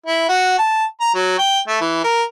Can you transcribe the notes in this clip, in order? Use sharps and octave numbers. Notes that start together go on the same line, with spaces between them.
E4
F#4
A5
A#5
F#3
G5
A3
E3
A#4